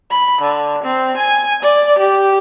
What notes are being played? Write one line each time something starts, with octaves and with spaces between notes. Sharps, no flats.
B5
D3
C4
G#5
D5
G4